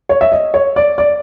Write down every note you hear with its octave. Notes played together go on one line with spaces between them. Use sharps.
C#5
E5
D#5
C#5
D5
D5